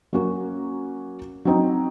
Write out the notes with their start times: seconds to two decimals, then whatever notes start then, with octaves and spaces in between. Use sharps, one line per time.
0.13 F#3 A#3 C#4 F#4
1.45 F#3 C4 D#4